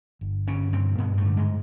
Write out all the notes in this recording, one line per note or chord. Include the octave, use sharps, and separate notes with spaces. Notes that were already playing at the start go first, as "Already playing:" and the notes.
G1
G1 C#3 C#4
G2 C3 C4
G2 B2 B3
A2 A3
D3
G#2 G#3